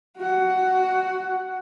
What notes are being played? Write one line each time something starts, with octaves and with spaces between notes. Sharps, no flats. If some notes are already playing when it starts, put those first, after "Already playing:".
F#4 F#5